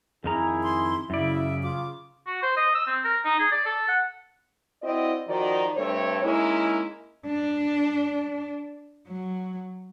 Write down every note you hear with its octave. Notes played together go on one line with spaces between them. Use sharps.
F2 D#3 E4 G#4 A#5
C6
F#2 C#3 E4 D5 E5
F4 D6
F#4
C5
D#5
E6
C4
A#4
D#4
G#4
D5
A4
F#5
C4 E4 F#4 D5 D#5
D#3 F3 D#4 F#4 D5
G2 A3 C4 C#5
G#3 A#3 C#4 D#4 E4
D4
F#3